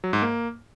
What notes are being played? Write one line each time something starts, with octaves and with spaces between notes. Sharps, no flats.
F#3
G#2
A#3